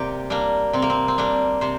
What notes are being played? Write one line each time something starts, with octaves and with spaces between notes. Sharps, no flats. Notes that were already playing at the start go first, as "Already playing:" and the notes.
Already playing: C3 G3 A#3 G4
G3 A#3 D4
C3 C4
A#3
C4
C4
G3 A#3 D4
C3 C5